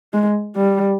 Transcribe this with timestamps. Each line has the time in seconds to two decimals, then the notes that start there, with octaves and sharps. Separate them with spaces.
0.14 G#3
0.56 G3